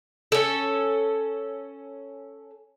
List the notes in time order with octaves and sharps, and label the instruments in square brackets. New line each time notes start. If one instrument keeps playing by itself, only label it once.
[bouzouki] C#4 A4